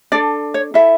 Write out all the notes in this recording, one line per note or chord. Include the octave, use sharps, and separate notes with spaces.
D4 A4 D5
C#5
E4 A4 E5